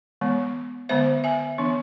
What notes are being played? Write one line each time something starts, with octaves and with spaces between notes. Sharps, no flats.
E3 G#3 B3
D3 G#3 B3 C5 E5
E5 G#5
E3 B3 D4